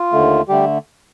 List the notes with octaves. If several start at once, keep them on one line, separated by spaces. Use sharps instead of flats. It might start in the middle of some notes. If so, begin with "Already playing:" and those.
Already playing: F4
D#2 D3 A3
D3 G3 A3 G4